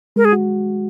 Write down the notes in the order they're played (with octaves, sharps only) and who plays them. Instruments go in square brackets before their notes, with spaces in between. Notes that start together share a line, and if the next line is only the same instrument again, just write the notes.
[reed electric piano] G#3 [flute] A#4
[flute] G#4
[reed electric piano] F#4